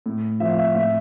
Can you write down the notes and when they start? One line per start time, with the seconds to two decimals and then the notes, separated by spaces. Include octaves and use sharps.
0.06 A2
0.40 F3 E5
0.50 F5
0.59 E5
0.75 A2 E5